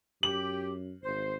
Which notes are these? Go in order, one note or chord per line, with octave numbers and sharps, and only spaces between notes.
F#2 G4 F#7
G#1 C5